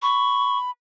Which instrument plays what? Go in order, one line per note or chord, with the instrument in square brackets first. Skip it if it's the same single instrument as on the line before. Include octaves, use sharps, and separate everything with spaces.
[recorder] B5 [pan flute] C#6